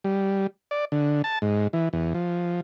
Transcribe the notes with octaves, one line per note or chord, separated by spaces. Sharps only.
G3
D5
D3
A5
G#2
E3
E2
F3